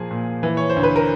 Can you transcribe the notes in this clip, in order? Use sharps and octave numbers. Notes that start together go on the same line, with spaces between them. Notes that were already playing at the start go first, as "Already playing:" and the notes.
Already playing: A#2 F3 A#3 G#4
A#2
E3
C#5
C5
D2
B4
A#4